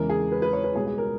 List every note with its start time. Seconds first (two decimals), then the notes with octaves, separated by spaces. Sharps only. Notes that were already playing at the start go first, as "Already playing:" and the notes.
Already playing: E2 C#3 E3 G#3 A#4
0.10 G#4
0.32 B4
0.42 B4
0.53 C#5
0.64 B4
0.75 C#2 B2 G3 G#4
0.87 G#4
0.98 A#4